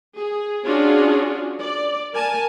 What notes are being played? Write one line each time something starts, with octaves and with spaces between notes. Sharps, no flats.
G#4
C#4 D4 F4 F#4 G#4
D5
A#4 G#5 A5